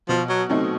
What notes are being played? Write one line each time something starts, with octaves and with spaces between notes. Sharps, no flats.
B2 F3
F#3
C3 F#3 A3 C4 D#4